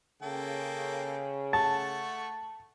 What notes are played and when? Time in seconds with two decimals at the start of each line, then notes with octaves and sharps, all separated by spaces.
0.22 C#3 A#3 A4 G5
1.53 A3 F#5 A5 C#6 A6